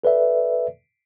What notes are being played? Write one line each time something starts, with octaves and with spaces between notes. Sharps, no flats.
A4 B4 D5 E5